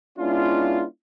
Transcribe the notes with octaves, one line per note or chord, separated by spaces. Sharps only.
G#3 B3 C#4 D4 E4 F4